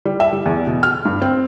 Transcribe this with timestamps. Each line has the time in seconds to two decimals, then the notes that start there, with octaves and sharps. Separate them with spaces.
0.05 G3
0.20 E5
0.33 G3
0.46 E2
0.67 B2
0.83 F6
1.05 G2
1.22 C4